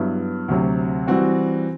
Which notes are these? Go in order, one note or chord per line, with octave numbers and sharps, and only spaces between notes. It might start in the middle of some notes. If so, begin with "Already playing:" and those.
Already playing: G2 F#3 B3 E4
D2 C3 F#3
E3 G3 C4 F#4